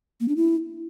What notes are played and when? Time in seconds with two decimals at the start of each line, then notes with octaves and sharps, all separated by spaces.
0.20 A#3
0.28 D4
0.37 E4